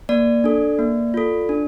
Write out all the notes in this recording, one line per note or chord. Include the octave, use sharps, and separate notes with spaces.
A#3 D5
D4 A4
A#3
F4 A4
D4